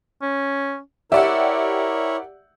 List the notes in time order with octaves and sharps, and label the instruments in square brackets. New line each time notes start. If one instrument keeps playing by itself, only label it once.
[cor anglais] C#4
[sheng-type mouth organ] E4 C#5 [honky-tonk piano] G4 D5 F#5 [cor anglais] A#4 [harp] E5